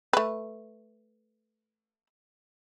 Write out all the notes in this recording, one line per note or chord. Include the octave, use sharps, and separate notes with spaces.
A3 B4